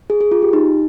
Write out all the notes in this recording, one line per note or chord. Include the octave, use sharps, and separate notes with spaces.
G#4
G#4
F4
G4
D#4